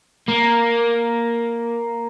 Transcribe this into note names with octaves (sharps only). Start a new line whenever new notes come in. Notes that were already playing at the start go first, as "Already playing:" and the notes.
A#3